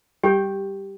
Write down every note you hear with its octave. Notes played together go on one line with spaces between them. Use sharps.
G3 G4 G5